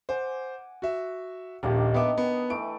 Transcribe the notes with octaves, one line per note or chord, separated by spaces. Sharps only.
C5 F#5 G#5 D6
F#4 E5
D#1 A#1 D#3 A#3 D4 G4
B3 D#5 E5 G5 A5 D6
B3
E3 A3 B4 D7